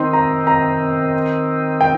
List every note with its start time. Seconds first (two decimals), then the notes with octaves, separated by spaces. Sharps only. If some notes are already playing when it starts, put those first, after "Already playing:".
Already playing: D#3 C4 D#4 C6
0.13 A#5
0.47 A#5
1.81 G5